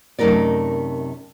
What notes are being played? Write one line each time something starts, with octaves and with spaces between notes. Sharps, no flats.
F#2 C3 A3 D#4 A#4 D5